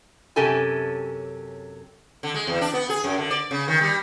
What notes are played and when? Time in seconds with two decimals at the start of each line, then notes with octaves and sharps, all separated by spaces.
0.36 F#2 C3 C#4 G4 A4 G#5
2.23 D3
2.34 G#3
2.47 E2
2.61 D4
2.74 B3
2.89 G#4
3.04 F#2
3.17 D3
3.31 D5
3.51 C#3
3.68 D#3
3.81 G3